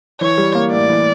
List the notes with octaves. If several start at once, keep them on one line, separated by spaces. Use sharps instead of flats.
E3 C#5
G3
A#3
A2 D5
E3